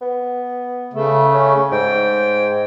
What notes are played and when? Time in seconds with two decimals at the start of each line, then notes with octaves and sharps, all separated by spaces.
0.01 B3
0.93 C#3 A3
1.34 C#4
1.72 G#2 G5